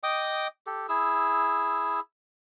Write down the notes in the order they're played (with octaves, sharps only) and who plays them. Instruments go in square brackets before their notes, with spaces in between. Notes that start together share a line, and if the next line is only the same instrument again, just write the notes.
[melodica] D#5 G5 D6 D#6
G4 A4
E4 G#4 E6